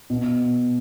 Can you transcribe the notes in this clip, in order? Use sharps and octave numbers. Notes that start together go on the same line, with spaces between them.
B2